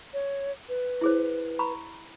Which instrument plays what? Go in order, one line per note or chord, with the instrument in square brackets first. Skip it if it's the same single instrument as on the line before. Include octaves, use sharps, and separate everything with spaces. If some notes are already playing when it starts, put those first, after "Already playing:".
[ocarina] C#5
B4
[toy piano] E4 G#4 C5
A#5 B5 C#6